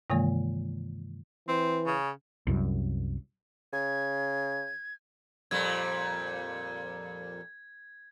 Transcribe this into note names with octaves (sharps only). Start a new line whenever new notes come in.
G2 C3 D#3 E3 G#3 A#3
E3 C4
C#3
C2 F#2
C#3 G#6
F2 A#2 G3 G#6